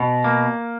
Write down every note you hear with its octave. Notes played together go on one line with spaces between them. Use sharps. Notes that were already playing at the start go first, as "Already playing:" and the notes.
Already playing: B2
A#3